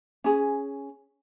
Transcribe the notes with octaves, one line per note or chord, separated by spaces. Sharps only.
C#4 G#4